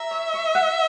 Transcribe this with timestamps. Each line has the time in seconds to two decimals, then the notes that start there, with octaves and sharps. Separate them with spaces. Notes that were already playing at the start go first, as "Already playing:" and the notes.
Already playing: E5 A#5
0.11 C#5
0.34 C#6
0.55 F#5